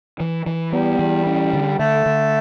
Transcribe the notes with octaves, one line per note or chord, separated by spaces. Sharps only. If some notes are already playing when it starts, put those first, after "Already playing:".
E3
E3
G3 B3
E3
C#4
D3
D3 A3
D3